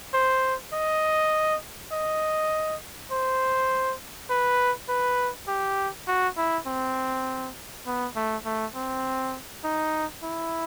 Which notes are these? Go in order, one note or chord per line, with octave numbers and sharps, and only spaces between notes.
C5
D#5
D#5
C5
B4
B4
G4
F#4
E4
C4
B3
A3
A3
C4
D#4
E4